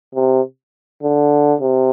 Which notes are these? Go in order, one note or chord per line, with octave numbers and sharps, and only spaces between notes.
C3
D3
C3